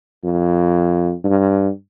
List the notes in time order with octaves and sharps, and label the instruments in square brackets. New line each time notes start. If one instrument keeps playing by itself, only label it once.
[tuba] F2
G2